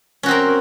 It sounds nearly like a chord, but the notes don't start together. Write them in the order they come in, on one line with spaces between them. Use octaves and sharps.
C#4 F#4 C4 A#4